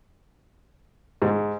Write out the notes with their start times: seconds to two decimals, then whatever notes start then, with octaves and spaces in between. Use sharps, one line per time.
1.22 G#2